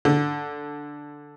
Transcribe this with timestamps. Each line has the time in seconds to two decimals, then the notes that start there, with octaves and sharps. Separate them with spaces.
0.05 D3